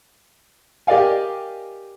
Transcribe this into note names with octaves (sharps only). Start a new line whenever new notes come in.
G4 A#4 D5 D#5 F5 G#5